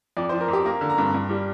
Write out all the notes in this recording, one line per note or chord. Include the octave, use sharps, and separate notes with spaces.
F2 D5
F3 C5
A#4
F2 G4
A#3 A#4
D3
A#5
G2
G2
G3